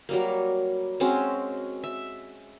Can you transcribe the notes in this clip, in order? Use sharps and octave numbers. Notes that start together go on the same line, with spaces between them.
F#3 G3 A#3
G#3 C4 C#4 F#4
E5